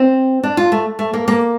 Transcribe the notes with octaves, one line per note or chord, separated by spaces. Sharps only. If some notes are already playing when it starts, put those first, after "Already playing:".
Already playing: C4
D4
F4
A3
A3
A#3
A#3